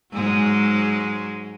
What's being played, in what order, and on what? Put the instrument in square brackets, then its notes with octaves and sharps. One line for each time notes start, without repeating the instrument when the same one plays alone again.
[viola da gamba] G#2 F#3 G#3